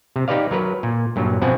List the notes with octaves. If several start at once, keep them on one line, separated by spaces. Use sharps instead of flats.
C3
D#4 G4 B4 D5 F5
F#3 A#4 B4
A#2
G2 A#2 F#3
B2 F3 C4 F#5 G#5